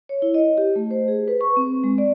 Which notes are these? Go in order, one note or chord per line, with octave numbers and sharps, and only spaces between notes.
C#5
E4
D#5
G4
A3
C5
G#4
B4
C#6
C4
G#3
D5